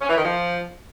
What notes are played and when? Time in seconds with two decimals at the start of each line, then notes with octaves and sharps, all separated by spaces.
0.02 C#4
0.09 E3
0.17 D#3
0.24 F3